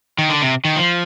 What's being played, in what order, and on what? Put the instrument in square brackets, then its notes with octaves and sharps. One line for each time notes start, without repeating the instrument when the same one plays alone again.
[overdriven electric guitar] D#3
D3
C3
D#3
F3